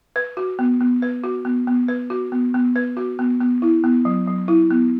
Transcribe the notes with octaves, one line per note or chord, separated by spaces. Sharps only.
B4
F#4
B3
B3
B4
F#4
B3
B3
B4
F#4
B3
B3
B4
F#4
B3
B3
E4
B3
F#3
F#3
E4
B3